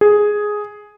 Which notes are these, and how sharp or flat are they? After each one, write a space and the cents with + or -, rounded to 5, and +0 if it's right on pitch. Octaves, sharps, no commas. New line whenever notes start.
G#4 +5